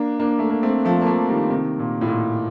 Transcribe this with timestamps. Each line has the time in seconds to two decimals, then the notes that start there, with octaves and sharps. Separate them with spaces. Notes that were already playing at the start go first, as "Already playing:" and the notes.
Already playing: A#3 D4
0.20 A#3 D4
0.39 A3
0.50 A#3
0.63 A3 C4
0.85 F3 A3
1.01 A#3
1.06 F3 A3
1.29 D#3 G3
1.50 C3 D#3
1.79 A#2
2.01 A2
2.07 A#2